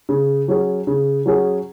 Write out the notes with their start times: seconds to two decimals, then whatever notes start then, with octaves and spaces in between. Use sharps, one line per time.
0.09 C#3
0.48 F#3 C#4 G#4
0.87 C#3
1.26 F#3 C#4 G#4